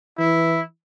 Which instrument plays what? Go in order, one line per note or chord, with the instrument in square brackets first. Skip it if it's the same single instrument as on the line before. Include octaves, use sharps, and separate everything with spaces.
[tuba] E3 [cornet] E4